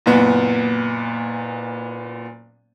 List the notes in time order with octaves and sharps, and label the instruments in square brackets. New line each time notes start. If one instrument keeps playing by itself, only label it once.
[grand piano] F#1 A#2 B3